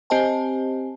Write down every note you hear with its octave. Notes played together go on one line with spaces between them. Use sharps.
C4 G4 C5 D#5 G#5 A5